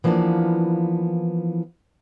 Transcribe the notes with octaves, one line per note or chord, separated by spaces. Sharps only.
E3 F3 A#3 B3 D4